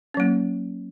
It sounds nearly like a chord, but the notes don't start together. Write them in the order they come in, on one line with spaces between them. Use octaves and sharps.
C#4 F#3 A#3